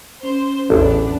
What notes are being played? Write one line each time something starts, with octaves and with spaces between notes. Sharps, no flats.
C#4 C5
A1 E2 B3 D4